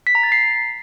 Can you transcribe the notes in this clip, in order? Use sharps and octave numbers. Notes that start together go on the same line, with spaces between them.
B6
A#5
A6
C7